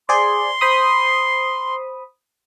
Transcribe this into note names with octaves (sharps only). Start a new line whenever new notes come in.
G#4 C5 D5 C6
C5 B5 D#6